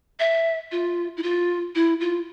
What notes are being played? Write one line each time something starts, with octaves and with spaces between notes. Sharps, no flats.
E5
F4
E4
F4
E4
F4